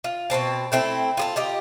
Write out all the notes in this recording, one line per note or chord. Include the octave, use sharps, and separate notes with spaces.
F4
B2 B3 C4 A5
A3 C4 E4 A4
F4 G#4 A4
F4 G4 D#5